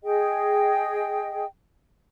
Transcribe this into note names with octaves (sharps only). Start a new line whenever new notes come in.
G#4 D#5 G5